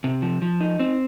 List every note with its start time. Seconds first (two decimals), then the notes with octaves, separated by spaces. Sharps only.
0.04 C3
0.22 F3
0.42 F3
0.60 D#4
0.80 C4